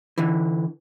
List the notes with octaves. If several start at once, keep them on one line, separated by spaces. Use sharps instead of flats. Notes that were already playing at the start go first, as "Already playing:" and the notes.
D3 E3